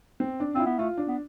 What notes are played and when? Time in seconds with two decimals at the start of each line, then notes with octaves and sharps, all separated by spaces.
0.20 C4
0.40 D4
0.55 C4 F4
0.60 E4
0.66 B3
0.79 A3 F4
0.98 D4
1.08 B3